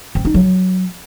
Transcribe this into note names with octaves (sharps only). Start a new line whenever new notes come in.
C4
D#4
F#3